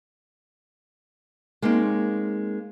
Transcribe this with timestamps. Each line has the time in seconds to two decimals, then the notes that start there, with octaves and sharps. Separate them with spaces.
1.62 G#3 A#3 C4 C#4 D#4